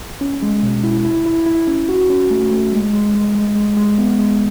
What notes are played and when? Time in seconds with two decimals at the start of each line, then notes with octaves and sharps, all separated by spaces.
0.21 C#4
0.42 G#3
0.62 B2
0.84 E4
1.05 E4
1.26 E4
1.46 E4
1.67 C#4
1.89 F#4
2.10 C#4
2.30 A3
2.52 A3
2.72 G#3
2.94 G#3
3.14 G#3
3.35 G#3
3.56 G#3
3.77 G#3
3.98 B3
4.19 G#3